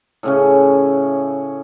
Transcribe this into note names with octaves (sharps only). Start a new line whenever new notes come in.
A2 C#3 C#4